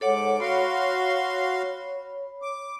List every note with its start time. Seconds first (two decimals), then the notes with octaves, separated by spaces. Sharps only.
0.01 G#2 A4 C#5 F#5 D6
0.40 F#4 C#5 F5 B5 C6
2.42 D6